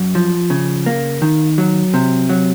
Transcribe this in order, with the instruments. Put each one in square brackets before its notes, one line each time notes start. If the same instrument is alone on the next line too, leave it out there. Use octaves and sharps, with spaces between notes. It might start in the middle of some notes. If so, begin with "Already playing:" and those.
Already playing: [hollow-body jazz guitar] F#2
F3
C#3
A#3
D#3
F#3
C3
F#3